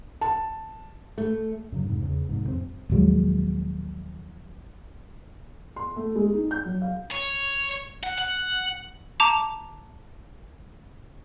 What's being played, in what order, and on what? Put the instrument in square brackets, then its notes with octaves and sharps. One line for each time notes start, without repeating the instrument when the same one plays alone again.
[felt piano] A5
[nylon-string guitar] A3
[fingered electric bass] F#2 C#3 F#3
F2 G#2 C3
E2 C#3
A#1 G#2 C3 D#3
A1 F2 C4
A#1 D#2 F#3 G#3
[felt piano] C6
A3
G#3
D#4
G6
F#3
F5
[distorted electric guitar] C#5
F#5
F#5
[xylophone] A5 A#5 D6